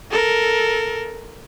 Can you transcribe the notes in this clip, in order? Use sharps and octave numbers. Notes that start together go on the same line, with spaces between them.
A4 A#4